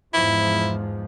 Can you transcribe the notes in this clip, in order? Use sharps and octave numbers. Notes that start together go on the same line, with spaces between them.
E2 G#2 F3 E4